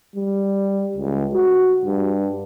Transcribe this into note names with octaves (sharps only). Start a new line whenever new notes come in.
G3
C#2
F#4
G2